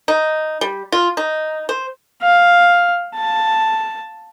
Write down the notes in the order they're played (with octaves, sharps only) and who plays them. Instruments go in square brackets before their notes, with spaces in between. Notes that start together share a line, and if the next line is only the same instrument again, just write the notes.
[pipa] D#4
G3
F4
D#4
C5
[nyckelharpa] F5
A5